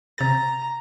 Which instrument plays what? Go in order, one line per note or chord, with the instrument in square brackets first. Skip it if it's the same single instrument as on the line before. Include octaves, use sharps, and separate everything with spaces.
[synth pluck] C3 A6 [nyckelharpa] A#5